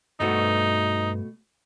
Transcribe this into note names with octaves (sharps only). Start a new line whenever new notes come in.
G2 B2 A3 D#4 F#4 B4 C5